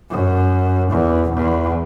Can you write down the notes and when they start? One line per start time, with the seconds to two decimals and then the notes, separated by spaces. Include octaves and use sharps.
0.10 F#2
0.91 E2
1.31 E2